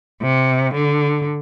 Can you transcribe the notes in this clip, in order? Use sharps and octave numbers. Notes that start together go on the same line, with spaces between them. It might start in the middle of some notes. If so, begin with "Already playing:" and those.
C3
D3